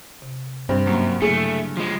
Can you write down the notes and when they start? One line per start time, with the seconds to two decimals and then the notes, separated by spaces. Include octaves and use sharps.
0.22 C3
0.69 G2 C4
0.87 F#2 A#3 A#5
1.22 C#3 F#3 A3 E4 G#4
1.77 F3 G#3